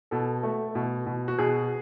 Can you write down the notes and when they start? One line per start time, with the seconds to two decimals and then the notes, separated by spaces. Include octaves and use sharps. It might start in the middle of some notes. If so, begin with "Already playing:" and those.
0.11 B2 A4
0.43 A3
0.75 B2
1.06 B2
1.28 F#4
1.39 B2 G#4